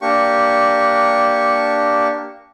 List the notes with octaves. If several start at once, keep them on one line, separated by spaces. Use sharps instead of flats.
A#3 D4 G4 C#6